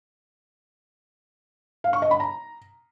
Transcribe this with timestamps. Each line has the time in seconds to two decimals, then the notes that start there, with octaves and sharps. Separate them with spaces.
1.84 F5
1.93 C#6
2.02 D#5
2.11 B5
2.20 A#5